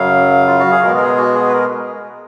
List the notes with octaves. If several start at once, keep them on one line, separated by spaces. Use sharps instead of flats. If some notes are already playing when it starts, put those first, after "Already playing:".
Already playing: F#2 C#3 F#3 F5
F4
F#4
G#4
B2 G#3 B3 A#4
A#4
G#4
F#4
G#4
B4
A#4